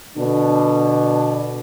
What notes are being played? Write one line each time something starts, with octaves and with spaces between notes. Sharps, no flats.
B2 D3 D4